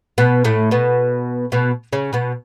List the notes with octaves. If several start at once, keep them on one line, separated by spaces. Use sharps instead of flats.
B2 B3
A2 A3
B2 B3
B2 B3
C#3 C#4
B2 B3